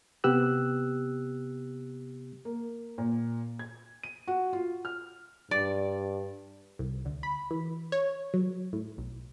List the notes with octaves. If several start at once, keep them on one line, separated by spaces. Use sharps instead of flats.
C3 B3 G4 E6 F#6
A#3
A#2
G#6
D#7
F#4
F4
F6
G2 D5
C2
D2
B5
E3
C#5
F#3
A2
B1